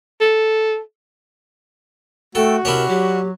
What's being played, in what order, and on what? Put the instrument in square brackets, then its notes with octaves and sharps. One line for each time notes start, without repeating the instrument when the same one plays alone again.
[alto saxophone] A4
[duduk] A3 [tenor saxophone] F#4 [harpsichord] A4 [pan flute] G5
[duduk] C3 [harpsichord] C#4 D4 E4 [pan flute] A#4
[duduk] F#3 [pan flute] G4